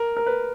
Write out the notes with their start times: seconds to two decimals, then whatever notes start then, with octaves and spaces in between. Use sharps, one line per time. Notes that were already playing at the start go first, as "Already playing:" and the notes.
Already playing: A#4
0.17 A#4
0.26 B4